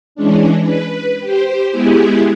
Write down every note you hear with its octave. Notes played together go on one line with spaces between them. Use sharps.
E3 G#3 C#4 D4
B4
G4 C5
G#3 B3 E4 G4 G#4